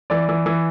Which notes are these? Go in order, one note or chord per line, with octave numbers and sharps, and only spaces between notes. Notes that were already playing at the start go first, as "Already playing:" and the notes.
E3 D5
E3
E3